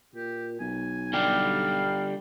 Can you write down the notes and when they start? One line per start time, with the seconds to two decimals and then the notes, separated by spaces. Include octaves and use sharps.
0.15 A#2 G4
0.60 B1 G#5
1.13 D3 G3 G4 F5